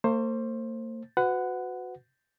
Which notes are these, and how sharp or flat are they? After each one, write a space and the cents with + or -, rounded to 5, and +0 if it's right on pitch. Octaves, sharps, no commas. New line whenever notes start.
A#3 -45 C5 +20
F#4 -15 B4 +35 F#5 +0